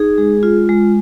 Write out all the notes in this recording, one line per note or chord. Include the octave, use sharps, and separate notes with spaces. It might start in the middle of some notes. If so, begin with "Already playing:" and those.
Already playing: D#4 G#4
G#3
F4
G#3